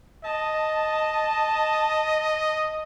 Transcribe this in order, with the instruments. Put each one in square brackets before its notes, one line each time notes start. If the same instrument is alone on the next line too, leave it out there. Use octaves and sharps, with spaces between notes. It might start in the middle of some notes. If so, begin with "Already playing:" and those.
[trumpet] D#5 [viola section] A5